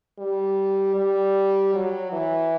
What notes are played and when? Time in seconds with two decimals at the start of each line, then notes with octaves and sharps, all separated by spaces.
0.19 G3
0.95 G3
1.74 F#3
2.12 E3